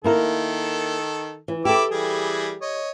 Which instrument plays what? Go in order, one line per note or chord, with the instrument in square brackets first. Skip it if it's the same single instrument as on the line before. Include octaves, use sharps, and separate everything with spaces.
[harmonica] D#3 A4 [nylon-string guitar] A#3 E4 A#4
[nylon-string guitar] E3
[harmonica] E4 D6 E6 [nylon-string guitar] G4 A4
[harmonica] E3 G3 G#4
C#5 D#5